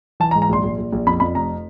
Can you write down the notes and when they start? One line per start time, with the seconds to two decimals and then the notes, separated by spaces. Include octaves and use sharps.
0.20 E3 A5
0.31 A#5
0.35 G#2
0.42 A#5
0.49 A#1 C6
0.64 A#1
0.78 A#1
0.93 A#1
1.07 F2 B5
1.20 F2 B5
1.35 F1 A#5